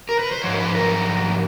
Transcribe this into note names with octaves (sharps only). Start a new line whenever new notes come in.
A#4
B4
C5
G#2 F3 C#5
A#4
B4
A#4